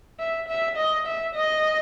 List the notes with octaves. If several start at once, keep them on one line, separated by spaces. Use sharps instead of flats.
E5
E5
D#5
E5
D#5